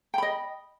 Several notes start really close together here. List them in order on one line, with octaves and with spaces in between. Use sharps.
G5 B5 D#5